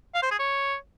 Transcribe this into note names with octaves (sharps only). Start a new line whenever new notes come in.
F5
C5
G#4
C#5